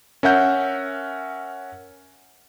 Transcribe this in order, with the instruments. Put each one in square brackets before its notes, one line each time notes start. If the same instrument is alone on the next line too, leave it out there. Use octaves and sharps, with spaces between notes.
[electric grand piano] C#4 A#4 E5 F#5 G6